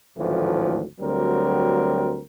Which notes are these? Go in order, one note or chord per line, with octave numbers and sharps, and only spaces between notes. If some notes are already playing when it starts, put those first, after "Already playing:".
G#1 D2 A2 E3 F3
D2 F#3 G3 C4 A#4